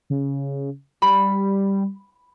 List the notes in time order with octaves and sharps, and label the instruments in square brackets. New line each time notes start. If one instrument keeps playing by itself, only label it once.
[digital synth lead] C#3
[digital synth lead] G3 [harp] B5